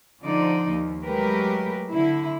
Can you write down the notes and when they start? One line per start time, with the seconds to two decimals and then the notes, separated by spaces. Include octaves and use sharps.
0.23 D3 F3 D#4 D5
0.70 D#2
1.03 F#3 G#3 A3 G4 A#4 B4
1.90 D3 E4